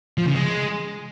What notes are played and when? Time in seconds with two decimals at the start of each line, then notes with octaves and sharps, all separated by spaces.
0.18 F3
0.26 C#3
0.34 G#3